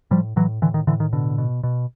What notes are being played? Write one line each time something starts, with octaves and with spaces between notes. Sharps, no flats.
A2 F3 G3
A2 E3 F#3
A2 D3 E3
D#3
A2 D3 E3
D#3
B2 D3
B2
B2